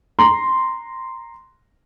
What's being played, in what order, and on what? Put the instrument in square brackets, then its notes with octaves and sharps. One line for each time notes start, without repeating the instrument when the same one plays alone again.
[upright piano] A#5 C6